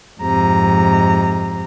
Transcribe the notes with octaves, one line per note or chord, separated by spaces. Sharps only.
F2 G#2 C3 A#5